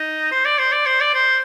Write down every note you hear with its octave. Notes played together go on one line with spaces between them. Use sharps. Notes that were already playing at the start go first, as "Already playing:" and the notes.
Already playing: D#4
C5
D5
C5
D5
C5
D5
C5